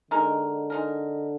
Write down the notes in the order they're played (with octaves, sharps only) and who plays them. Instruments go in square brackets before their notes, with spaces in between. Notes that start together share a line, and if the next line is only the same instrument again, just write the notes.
[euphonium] D3 [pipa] G#3 D#4 A#4
[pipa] G#3 D#4 A#4